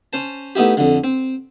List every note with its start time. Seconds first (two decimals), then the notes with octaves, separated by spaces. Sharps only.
0.13 C#4 C5 A5
0.55 A3 B3 D#4 E4 G4
0.77 F2 D3
1.04 C4